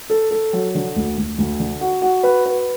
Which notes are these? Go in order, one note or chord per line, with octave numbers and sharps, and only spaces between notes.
A4
A4
F#3
D3
D2
D2
D2
D3
F#4
F#4
B4
B4